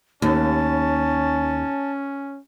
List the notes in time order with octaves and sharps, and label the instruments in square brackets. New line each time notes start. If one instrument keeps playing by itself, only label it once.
[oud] D#2 [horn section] C#4 [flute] A5